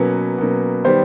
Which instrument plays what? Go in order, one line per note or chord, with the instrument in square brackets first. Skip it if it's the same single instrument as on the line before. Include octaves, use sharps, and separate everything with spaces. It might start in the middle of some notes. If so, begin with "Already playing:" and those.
Already playing: [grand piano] B2 F#3 A#3 C#4 [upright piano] B4
[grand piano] B2 F#3 A#3 C#4
[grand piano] D#3 G3 B3 [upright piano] C5